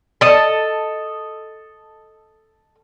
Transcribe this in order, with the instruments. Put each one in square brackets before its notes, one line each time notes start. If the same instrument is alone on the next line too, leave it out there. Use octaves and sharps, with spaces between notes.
[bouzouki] A4 D#5